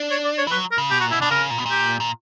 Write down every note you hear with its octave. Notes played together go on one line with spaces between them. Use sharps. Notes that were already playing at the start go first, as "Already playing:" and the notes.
Already playing: D4
C#5
D5
C#5
E3
F#3 B4
A#4
C#3
B2 G4
A#2 F#4
B2 E4
B2 D4
C#3 A#4
A#2
B2
A#2
G4
A#2